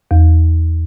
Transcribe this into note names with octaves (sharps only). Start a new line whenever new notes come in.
E2